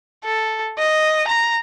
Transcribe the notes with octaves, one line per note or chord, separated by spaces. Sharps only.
A4
D#5
A#5